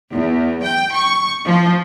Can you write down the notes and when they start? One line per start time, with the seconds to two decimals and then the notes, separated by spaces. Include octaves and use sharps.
0.11 E2
0.62 G5
0.94 C#6
1.46 F3